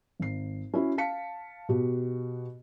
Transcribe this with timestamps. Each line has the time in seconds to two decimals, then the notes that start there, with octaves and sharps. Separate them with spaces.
0.20 G#1 C7
0.74 C#4 E4 F#4
0.98 F5 A5 B6 C#7
1.69 B2 F#4 G4